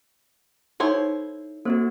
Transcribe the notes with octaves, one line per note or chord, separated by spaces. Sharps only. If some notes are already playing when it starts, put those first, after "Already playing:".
D#4 E4 A4 C5 C#5
A#3 C4 F#4 A4 C5